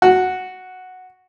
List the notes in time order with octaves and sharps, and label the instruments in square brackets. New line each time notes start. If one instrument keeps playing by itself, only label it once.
[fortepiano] F#4